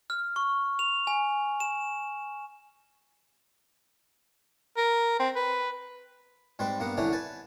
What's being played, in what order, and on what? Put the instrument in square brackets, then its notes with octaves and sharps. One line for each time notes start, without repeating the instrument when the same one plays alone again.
[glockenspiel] F6
C#6
F7
G#5
E7
[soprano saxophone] A#4
C4
B4
[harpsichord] G#2 G3 C4 B4
G2 A#3 B3 F#5
C2 D3 E3 C#4 D4 F#5
B4 G#5 A5